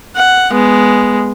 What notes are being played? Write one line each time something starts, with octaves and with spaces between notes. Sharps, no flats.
F#5
G#3 B3